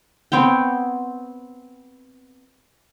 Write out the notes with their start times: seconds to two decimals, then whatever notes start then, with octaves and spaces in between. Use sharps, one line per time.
0.32 B3 C4 C#5 G5